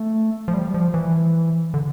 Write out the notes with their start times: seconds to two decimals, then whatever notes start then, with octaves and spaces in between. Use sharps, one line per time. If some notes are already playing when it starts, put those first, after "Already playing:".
Already playing: A3
0.48 F3
0.54 G3
0.74 F3
0.94 E3
1.74 D3